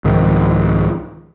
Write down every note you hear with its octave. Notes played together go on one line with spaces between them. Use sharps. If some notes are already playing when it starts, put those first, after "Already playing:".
C2 G#2 D#3 F3